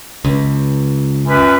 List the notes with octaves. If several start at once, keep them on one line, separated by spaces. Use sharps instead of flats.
C#2
F#2 A#2 B4